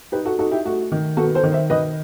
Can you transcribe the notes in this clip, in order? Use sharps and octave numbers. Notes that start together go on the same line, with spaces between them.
D#4 G4 B4
F#4 A4
D#4 F#4 A4
E4 G4
A3 F#4
D#3
B3 F#4 A4
A4 C5
D#3
C5 E5
D#3 B4 D#5